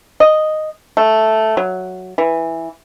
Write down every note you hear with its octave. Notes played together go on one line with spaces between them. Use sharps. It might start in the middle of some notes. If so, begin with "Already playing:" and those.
D#5
A3
F#3
E3